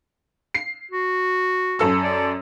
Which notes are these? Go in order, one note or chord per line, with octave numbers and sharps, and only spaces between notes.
C7
F#4
F#2 A4 E6
D5